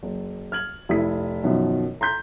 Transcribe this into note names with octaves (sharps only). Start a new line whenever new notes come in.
F#1
F6 G#6 F#7
F1 E4 D#6 B6
F#2 B2 D#3 F3
A#5 C6 G6 B6